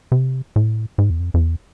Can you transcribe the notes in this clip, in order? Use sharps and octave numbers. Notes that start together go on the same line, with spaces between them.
C3
A2
G#2
E2
F2
F2
E2